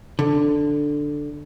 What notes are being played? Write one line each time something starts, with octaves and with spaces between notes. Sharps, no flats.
D3